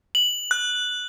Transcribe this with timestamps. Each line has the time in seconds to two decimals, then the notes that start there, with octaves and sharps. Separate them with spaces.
0.15 F#7
0.51 F#6